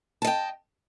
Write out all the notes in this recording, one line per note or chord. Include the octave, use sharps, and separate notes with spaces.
D#5 G5 A5